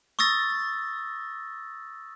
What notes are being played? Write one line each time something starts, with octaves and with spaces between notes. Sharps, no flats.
C#6 D#6 E6 A6 A#6